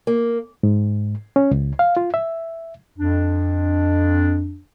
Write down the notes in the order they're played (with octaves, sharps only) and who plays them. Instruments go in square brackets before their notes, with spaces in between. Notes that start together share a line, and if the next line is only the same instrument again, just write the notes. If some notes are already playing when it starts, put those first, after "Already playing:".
[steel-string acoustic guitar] A#3
[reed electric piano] G#2
C#4
C#2
F5
F4
E5
[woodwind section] F2 D4